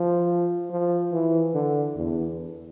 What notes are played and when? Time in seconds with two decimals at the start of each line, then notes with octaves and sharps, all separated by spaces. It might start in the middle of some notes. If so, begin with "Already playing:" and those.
Already playing: F3
0.71 F3
1.13 E3
1.54 D3
1.96 E2